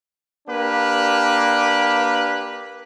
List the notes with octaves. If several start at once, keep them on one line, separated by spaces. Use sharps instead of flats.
A#3 D4 G4 B4